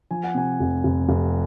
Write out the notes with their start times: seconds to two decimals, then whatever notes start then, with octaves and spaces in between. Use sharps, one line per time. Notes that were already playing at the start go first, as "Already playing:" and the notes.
0.11 F3 G#5
0.24 F#5
0.34 C3 G#5
0.60 F1
0.84 F1
1.09 F1